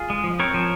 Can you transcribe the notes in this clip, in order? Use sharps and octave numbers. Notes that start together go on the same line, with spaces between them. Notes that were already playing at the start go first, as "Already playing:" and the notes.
Already playing: F4 G#4
G#3
F3
C4 A#4 C#5
F3